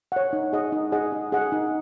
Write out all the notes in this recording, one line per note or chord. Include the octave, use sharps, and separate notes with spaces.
C#5 F#5
D#4
G#4 D#5 F#5
D#4
G#4 D#5 F#5
D#4
G#4 D#5 F#5
D#4